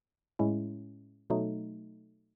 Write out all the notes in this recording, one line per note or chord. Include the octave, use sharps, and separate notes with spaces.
A2 G#3 C#4 E4
B2 F#3 A3 D#4